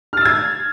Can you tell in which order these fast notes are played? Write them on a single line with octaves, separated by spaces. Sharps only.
F6 A6 E6 G#6